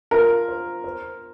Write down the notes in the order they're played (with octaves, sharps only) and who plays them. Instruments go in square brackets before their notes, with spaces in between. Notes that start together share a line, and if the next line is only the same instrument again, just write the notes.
[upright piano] F4 [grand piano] A#4
[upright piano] C5
C5